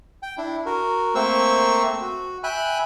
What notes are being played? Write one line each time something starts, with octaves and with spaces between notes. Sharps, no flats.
G5
D4 E4
F#4 A#4
A3 A#3 C4 C5 C#6 E6
F#4
E5 G5 G#5 B5 F#6